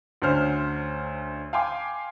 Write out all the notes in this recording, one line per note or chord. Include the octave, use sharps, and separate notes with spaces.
D2 D3 C#4 C5 F6
F5 G5 G#5 C6 D6